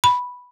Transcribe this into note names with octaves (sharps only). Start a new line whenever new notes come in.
B5